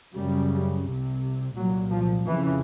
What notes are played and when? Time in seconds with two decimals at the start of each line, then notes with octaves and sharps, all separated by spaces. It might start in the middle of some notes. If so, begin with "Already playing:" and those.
0.15 F#2 C#3 G3
0.86 C2 C3
1.56 C2 A#2 F#3
1.92 F3
2.26 F2 C#3 E3